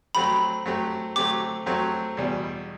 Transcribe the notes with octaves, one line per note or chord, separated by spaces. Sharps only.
F#3 A3 C4 G4 B5
F#3 A3 C4 G4
F#3 A3 C4 G4 D6
F#3 A3 C4 G4
E2 B2 G3